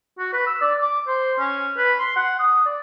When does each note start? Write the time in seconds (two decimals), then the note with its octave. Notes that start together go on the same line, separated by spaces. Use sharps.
0.19 F#4
0.33 B4
0.47 E6
0.61 D5
0.82 D6
1.07 C5
1.39 C#4
1.77 B4
1.99 C6
2.16 F#5
2.39 D#6
2.65 D5